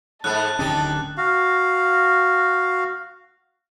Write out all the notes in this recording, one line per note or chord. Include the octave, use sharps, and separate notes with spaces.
G#2 A3 A5 F#6
D1 D3 D#3 C#4 D#4 G4
F#4 F5